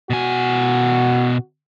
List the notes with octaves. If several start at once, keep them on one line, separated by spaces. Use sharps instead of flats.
B2 F#4 G#5